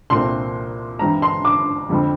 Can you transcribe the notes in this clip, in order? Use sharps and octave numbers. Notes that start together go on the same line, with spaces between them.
C2 A#2 A3 C4 C6
G2 E3 G3 C4 A#5
C6
D6
F2 D3 G3 C4